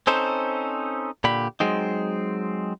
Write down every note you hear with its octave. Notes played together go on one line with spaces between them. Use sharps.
C4 C#4 D#4 A4 C5
A#2 D3 G4 B5
F#3 G#3 C4 D#4